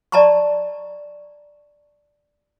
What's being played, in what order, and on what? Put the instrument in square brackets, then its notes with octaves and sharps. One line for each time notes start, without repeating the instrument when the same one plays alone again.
[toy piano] D5 D#5 A5 A#5 C6 C#6